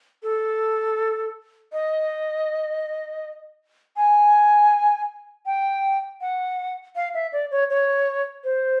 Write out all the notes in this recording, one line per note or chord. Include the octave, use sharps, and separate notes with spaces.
A4
D#5
G#5
G5
F#5
F5
E5
D5
C#5
C#5
C5